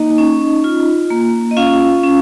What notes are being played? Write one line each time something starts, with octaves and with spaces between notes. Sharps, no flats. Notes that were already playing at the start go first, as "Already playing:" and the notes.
Already playing: A#3 D#4 D#5
C#4
F4
A#3
D#5
C#4 F4 F5
C#4